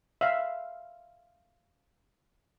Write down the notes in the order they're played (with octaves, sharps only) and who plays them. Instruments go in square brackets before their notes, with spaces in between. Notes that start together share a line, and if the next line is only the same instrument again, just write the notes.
[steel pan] E5 F5